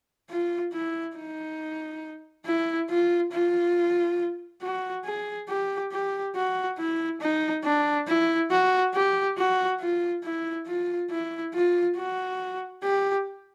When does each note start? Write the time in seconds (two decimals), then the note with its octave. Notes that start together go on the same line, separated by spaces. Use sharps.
0.30 F4
0.73 E4
1.17 D#4
2.46 E4
2.90 F4
3.32 F4
4.62 F#4
5.05 G#4
5.49 G4
5.92 G4
6.36 F#4
6.79 E4
7.21 D#4
7.64 D4
8.07 E4
8.50 F#4
8.94 G4
9.37 F#4
9.80 F4
10.23 E4
10.67 F4
11.11 E4
11.54 F4
11.96 F#4
12.83 G4